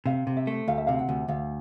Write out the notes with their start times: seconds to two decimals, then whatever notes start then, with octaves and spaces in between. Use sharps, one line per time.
0.06 C3 F5
0.27 C3
0.37 E5
0.47 A3
0.68 D2 F5
0.78 E5
0.87 C3 F5
0.99 F#5
1.09 D2
1.28 D2 F5